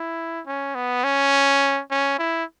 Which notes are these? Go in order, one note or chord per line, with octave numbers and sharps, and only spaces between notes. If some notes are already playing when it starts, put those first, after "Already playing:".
Already playing: E4
C#4
B3
C#4
C#4
E4